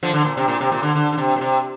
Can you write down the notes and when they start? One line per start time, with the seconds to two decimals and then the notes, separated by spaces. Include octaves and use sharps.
0.03 D3 F3
0.13 D3
0.25 A#2
0.37 C3
0.48 A#2
0.61 C3
0.72 A#2
0.83 D3
0.95 D3
1.12 D3
1.18 C3
1.36 A#2
1.41 C3